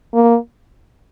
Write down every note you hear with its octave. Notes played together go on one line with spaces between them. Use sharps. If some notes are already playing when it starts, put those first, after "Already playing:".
A#3